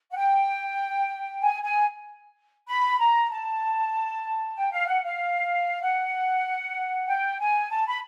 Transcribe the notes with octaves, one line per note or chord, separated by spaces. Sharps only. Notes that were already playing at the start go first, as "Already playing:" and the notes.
F#5
G5
G#5
G#5
B5
A#5
A5
G5
F5
F#5
F5
F#5
G5
G#5
A5
B5